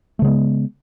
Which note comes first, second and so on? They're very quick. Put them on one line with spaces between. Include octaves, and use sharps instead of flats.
A3 C#3 G#3 B3